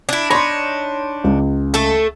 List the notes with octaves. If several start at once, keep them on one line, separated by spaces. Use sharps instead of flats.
D4 E4
D4 D#4 C#5 B5 C6
C#2
A3 A4